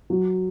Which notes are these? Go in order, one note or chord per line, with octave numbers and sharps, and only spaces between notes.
F#3 F#4